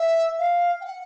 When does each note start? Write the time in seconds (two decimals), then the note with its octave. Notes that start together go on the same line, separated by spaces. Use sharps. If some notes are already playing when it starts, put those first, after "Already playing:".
Already playing: E5
0.39 F5
0.81 G5
0.85 F#5